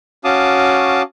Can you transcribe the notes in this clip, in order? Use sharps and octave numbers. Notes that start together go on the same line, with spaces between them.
C#4 F#4 F5 A5 D6 D#6